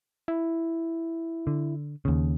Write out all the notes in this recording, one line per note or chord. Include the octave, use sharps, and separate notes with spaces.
E4
D3
D#2 C#3